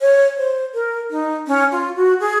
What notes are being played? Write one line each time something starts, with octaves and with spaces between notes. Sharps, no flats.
C#5
C5
A#4
D#4
C#4
F4
F#4
G#4